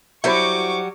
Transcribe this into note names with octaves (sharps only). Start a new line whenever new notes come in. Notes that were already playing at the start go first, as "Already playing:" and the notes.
F#3 G3 E4 F#4 C5 E5 C#6 D6